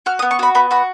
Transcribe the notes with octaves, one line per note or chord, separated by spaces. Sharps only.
F#4 F6
D#6
B3
C#6
F#4 B5
B3 B5
F#4 B5